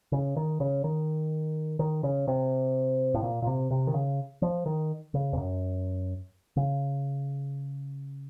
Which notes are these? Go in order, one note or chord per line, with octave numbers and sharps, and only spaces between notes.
C#3
D#3
C#3
D#3
D#3
C#3
C3
A2
A#2
A#2
C3
C3
D#3
C#3
F3
D#3
C#3
F2
F#2
C#3